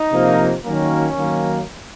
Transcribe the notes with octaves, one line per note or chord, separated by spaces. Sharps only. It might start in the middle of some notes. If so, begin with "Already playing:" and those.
Already playing: D#4
C3 F3 A#3
D#3 F#3 A#3 C#4
D#3 F#3 A#3